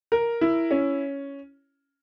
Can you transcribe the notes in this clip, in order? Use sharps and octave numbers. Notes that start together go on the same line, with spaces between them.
A#4
E4
C#4